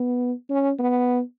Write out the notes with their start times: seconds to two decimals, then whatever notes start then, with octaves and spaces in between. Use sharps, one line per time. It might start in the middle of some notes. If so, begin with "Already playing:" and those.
Already playing: B3
0.50 C#4
0.79 B3